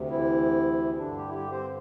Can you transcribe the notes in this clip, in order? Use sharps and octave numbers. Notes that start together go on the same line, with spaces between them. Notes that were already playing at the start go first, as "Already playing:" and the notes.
Already playing: D2 C3
E3 E4
G2 D3 D4
G3 G4
E4
G3 G4
C4 C5